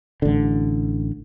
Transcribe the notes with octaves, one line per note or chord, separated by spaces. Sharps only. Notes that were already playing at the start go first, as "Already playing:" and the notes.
A1 D3